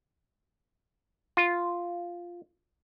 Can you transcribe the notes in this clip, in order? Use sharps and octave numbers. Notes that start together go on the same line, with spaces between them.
F4